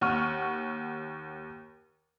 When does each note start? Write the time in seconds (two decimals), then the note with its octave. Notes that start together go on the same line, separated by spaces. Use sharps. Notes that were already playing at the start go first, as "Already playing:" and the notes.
0.01 D#2 F#5 C#6 F6 D#7